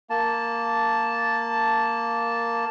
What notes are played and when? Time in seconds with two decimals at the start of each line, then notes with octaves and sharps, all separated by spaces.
0.10 A#3 A5